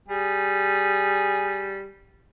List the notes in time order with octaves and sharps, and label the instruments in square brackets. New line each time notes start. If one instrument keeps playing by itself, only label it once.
[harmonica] G3 G#4